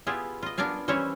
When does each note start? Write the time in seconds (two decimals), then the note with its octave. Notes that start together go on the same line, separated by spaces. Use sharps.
0.07 B3 E4 F4 G4 G#4
0.42 F4 D#5
0.58 B3 D4 A#4 D5 F5 G#5
0.88 E3 G3 C#4 E4 C5 C#5